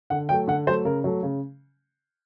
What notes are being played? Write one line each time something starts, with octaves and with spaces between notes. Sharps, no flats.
D3 F#5
F#3 A3 G5
D3 F#5
F#3 A3 C5
C#3 A#4
F#3 A3
C#3